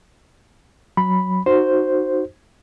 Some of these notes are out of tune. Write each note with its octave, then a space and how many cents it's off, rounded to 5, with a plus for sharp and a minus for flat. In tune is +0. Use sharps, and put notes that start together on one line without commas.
F#3 +0 B5 +0
D#4 -20 F#4 +0 C5 +0